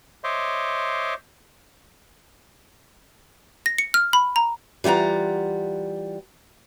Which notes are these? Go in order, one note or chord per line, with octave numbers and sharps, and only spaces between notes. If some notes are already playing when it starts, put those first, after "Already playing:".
C5 C#5 D#5 E5 C6 D6
A#6
C#7
F6
B5
A#5
E3 G3 F4 F#5 A#5